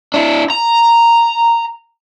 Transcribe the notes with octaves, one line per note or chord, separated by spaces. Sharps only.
D4 E4
A#5